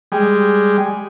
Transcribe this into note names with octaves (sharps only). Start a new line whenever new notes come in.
G3 G#3